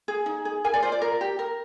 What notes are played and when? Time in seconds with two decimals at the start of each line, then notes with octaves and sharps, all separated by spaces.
0.08 G#4
0.26 D#4
0.45 G#4
0.64 A#4 G#5
0.74 D5
0.83 F4 C5
0.92 D5
1.02 A#4
1.21 G4
1.39 A#4